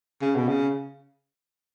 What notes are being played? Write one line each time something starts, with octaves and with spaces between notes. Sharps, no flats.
C#3
B2
C#3